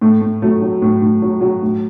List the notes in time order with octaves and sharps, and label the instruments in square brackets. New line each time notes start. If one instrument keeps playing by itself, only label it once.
[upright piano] A2 A3
A2
F#3 A3
F#3
A2
A2
F#3
F#3
A2